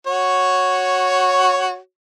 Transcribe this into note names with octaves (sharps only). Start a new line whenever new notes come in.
F#4 C#5